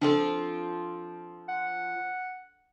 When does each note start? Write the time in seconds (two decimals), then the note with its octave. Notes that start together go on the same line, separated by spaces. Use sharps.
0.02 F3 C4 D4 F4 A4
1.49 F#5